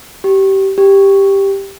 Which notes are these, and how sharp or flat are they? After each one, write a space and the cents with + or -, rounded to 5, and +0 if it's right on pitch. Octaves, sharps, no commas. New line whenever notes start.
G4 -20
G4 +5